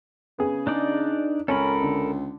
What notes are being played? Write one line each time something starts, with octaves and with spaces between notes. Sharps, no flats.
C#3 B3 G#4
D4 D#4 D5
C#2 C#4 A4 A#4 B5
D3